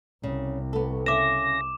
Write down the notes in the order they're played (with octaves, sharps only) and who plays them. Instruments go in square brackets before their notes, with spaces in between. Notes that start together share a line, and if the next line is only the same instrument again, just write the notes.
[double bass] C2 [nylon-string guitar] C#3
[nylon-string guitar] B3 A4
[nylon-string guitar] C#3 E5 [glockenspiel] D6 E7 [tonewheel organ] A#6